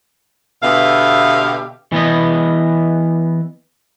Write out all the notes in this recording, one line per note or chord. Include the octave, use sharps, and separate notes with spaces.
B2 D3 B3 G4 E5 F5
E3 B3 D#5